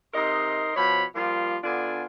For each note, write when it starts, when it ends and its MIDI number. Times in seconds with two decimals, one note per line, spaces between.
0.14 0.71 48
0.14 0.71 63
0.14 0.71 70
0.14 0.71 75
0.14 0.71 84
0.76 1.04 47
0.76 1.04 53
0.76 1.04 73
0.76 1.04 83
1.15 1.57 53
1.15 1.57 55
1.15 1.57 58
1.15 1.57 65
1.64 2.06 50
1.64 2.06 59
1.64 2.06 62
1.64 2.06 65
1.64 2.06 80